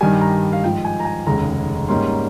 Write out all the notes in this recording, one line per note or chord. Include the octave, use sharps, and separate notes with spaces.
G2 D#3 G3 G#5
A#5
F5
G#2 F3 G#3 G5
G#5
A#5
G#5
F1 D#2 C#3 G#3 A#5
G#2 G3 A#3 C#4 C6